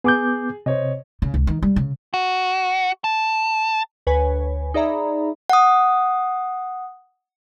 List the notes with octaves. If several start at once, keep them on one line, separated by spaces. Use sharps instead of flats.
B3 G#4 D6 G6
C3 C5 C#5 D#5
C#3
C#2
D#3
G3
C#3
F#4
A5
D2 B4 C#5 G#5
D#4 G#4 D5 E5 A#5 B5
F#5 D#6